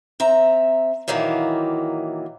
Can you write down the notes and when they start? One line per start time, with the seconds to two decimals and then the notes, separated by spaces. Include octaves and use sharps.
0.20 C4 E5 A#5
1.08 A#2 D#3 E3 F#3 A#3